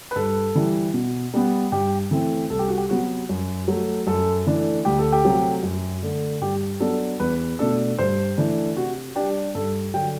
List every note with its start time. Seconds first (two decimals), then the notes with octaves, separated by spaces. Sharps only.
0.11 B4
0.16 G2 A4
0.55 E3 G3
0.94 B2
1.34 G3 B3
1.72 G2 G4
2.11 E3 A3 C4
2.50 C2 A4
2.59 G4
2.68 F#4
2.78 G4
2.89 C3 F#3 B3 F#4
3.29 F#2
3.68 F#3 A3
4.07 F#2 A4
4.47 E3 A3 D4
4.85 D2 G4
4.99 A4
5.12 G4
5.24 C3 F#3 A3 C4
5.63 F#2
6.02 D3 A3
6.41 G2 G4
6.80 F#3 B3 D4 A4
7.20 E2 B4
7.59 B2 A3 D4 A4
7.99 G2 C5
8.38 E3 A3 D4
8.76 C3 F#4
9.16 G3 D4 G4
9.55 G2 A4
9.94 D3 F#3 G5